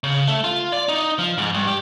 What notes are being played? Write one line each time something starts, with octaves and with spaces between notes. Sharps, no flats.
C#3
A3
F4
D5
D#4
F3
G#2
G2
G4